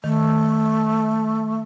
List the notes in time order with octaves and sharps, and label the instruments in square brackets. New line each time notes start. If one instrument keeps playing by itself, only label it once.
[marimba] D#3 [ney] A3